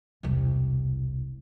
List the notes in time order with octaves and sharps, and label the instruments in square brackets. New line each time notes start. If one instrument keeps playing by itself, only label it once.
[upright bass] E1 C2